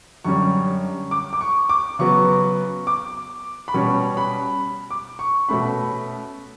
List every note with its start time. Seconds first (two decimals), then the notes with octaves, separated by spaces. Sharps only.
0.25 F#2 D3 G3 C#4 C#6
1.11 D6
1.33 D6
1.41 C#6
1.69 D6
1.99 C#3 F#3 B3 C#6
2.87 D6
3.68 B5
3.74 B2 G3 C#4 C#6
4.17 B5
4.90 D6
5.19 C#6
5.49 B2 A3 C#4 B5